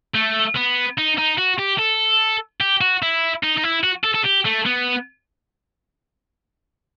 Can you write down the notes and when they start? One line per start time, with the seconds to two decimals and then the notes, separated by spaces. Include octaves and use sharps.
0.15 A3
0.56 B3
0.98 D#4
1.18 D#4
1.38 F#4
1.58 G4
1.78 A4
2.61 G4
2.81 F#4
3.02 E4
3.43 D#4
3.58 D#4
3.64 E4
3.84 F#4
4.04 A4
4.14 A4
4.24 G4
4.45 A3
4.66 B3